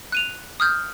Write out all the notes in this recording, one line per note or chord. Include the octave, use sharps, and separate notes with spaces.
F#6 D#7 F7
D#6 F6 G6